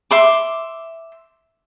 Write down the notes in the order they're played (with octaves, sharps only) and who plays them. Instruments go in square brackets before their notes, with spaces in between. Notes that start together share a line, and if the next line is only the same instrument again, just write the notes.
[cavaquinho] E5 C6 D6